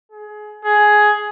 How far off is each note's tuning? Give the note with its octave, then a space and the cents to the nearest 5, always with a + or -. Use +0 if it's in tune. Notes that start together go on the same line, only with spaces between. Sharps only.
G#4 +25
G#4 +10